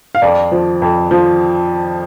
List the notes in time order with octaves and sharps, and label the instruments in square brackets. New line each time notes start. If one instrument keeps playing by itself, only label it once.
[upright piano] F5
F2 D5
F3
F2
F3